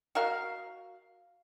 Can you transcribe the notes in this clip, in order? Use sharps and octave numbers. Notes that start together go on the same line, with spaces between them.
F#4 A#4 F5